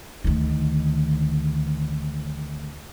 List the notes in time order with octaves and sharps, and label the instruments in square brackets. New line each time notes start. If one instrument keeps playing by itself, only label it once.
[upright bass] D2 D#3